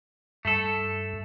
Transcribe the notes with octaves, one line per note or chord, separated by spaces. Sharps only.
G2 A3 A4